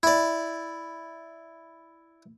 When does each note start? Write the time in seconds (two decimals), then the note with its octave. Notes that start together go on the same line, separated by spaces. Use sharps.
0.03 E4 D5